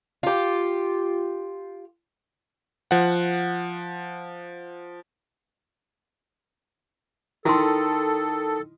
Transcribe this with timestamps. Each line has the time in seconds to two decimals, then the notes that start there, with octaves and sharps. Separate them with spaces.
0.23 F4 G4
2.91 F3 F#5
7.46 D#3 E4 A4 C6